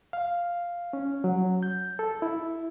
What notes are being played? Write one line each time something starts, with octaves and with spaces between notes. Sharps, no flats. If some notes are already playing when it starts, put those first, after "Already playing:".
F5
C#4
F#3
G6
A4
E4